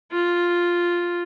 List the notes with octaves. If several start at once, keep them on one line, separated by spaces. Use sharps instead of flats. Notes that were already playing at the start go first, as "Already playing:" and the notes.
F4